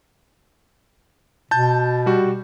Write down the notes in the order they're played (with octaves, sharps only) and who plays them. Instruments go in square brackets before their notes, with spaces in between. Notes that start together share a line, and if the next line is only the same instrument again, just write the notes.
[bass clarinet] B2 [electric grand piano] A5 G6
[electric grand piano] G3 F#4